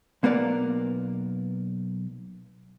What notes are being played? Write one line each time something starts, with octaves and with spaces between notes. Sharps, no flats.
B1 A#3 B3 A#4 D5